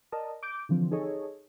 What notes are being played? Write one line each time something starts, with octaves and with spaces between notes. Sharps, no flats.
A#4 D5 D#5 A5
D6 G6 D7
D3 E3 F3 C4
D#4 G#4 A4 C#5 D#5